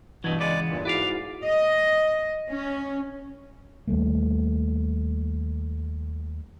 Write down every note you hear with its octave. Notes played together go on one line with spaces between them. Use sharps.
G2 B2 E3 F#3 A3 D#4 G#6
C#3 G#3 B3 B4 D5 D6
E2 G2 A#2
G#2 E4 F#4 G#4 B4 D5 F5
D#5
C#4
D#2 G3 A3 A#3